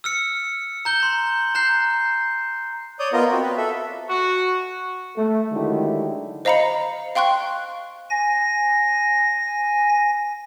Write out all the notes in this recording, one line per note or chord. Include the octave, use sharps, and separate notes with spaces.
E6 F6 C#7
A#5 G6 G7
A#5 C6
A#5 F#6 G6 C7
C#5 D5 D#6 G6
B3 F4 A#4 D#5
C4 F#4
B4
A4 E5
F#4
A3
D3 D#3 F#3 G#3 E4 G4
C5 D#5 F5 A#5 B5 C#7
F5 G5 C6 C#6 F#6
G#5 A#6